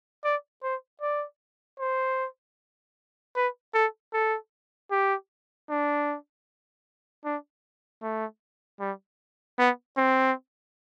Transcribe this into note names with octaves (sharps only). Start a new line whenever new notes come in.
D5
C5
D5
C5
B4
A4
A4
G4
D4
D4
A3
G3
B3
C4